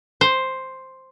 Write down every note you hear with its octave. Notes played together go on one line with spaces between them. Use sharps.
C5